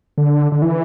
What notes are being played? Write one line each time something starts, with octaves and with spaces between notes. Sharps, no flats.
D3
D3
E3